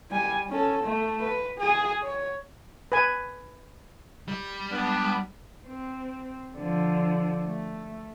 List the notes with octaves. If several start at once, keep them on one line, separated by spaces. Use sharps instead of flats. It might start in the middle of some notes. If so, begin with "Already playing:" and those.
G3 G#5
C#4 A4
A3
B4
G#4
C#5
B4 G#5
G3
B3 D4
C4
D3 F3
A3